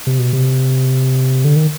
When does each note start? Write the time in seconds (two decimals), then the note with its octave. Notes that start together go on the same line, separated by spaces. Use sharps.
0.07 C3
0.19 B2
0.33 C3
1.44 D3
1.56 D#3